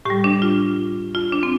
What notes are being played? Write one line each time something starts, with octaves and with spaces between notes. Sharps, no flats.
A2 G3 G4
D4
F4
F4
D4
C4